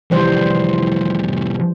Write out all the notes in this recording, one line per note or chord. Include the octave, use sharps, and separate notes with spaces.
C2 F2 E3 G3 C5